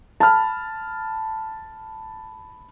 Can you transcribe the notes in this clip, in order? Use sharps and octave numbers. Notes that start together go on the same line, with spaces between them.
A5 B5 F6